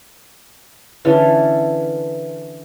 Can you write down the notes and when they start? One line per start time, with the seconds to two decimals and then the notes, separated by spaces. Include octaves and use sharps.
1.05 D3 E3 C#4 A4